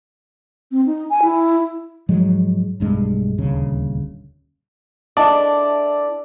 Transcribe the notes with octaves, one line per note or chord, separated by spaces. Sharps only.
C4
D#4
G#5
E4
G#2 F3 F#3 G#3
B1 G2 G#3
D#1 D2 C#3
D4 E4 G#4 A4 D5 D#5 A5